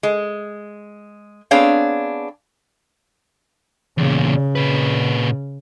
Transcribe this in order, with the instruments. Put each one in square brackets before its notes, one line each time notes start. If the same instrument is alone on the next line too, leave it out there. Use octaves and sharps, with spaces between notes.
[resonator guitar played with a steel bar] G#3
B3 C4 D4 G#4 C#5 F5
[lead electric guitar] E2 A#2 [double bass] C#3
[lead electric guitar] A#2 B4